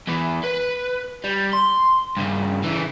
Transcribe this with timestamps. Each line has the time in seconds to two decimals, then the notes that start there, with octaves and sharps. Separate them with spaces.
0.07 E2 E3
0.44 B4
1.24 G3
1.53 C6
2.17 G2 C#3
2.64 C#3 E3